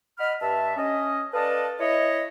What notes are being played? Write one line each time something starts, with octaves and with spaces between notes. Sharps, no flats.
D#5 F#5 B5 F6
G2 E5 A5
C#4 D#5
A4 B4 D5 D#5 F5 A5
E4 C#5 D#5